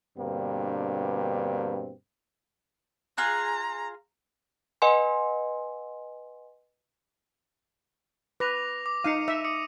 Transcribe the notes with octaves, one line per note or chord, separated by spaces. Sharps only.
G2 B2 D3 A#3 C4
F4 G#4 A#5 F#6
B4 D#5 F#5 G#5 C6
B4 D6 A#6 F7
D6
D#4 F5 C#7 D#7
E5
D6 D#6 C#7